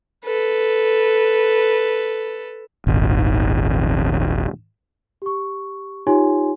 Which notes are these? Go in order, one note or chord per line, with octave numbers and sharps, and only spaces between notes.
A4 B4
D#1 G#1
G4 C#6
D#4 F4 G4 C#5 G#5 C6